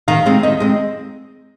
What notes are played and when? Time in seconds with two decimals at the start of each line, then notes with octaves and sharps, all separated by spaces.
0.08 D#3 F5
0.26 G#3 C4
0.43 D#3 D#5
0.60 G#3 C4